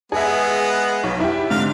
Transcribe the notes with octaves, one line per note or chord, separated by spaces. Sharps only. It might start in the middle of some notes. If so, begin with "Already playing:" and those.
G#3 B3 G#4 E5
B1
E4 G4
G#2 D3 F5